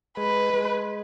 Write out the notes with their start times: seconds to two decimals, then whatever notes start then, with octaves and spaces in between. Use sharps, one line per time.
0.17 G#3 B4
0.54 G#3